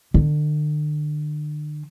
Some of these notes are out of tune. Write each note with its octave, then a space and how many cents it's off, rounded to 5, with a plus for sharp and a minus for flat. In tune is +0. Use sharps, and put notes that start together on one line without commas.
D3 +40